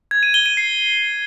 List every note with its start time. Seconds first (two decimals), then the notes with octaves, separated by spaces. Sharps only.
0.11 G#6
0.23 D#7
0.34 G7
0.46 D#7
0.57 C7